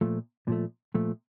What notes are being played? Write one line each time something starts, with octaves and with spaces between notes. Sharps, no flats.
A#2 F3 A3
A#2 F3 A3
A#2 F3 A3